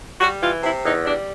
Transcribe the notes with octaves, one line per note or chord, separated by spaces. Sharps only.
G3 F#4
E3 F4
C3 E4
E2 D#4
G3 D4